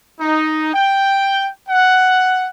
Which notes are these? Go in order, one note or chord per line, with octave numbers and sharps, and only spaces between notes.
D#4
G5
F#5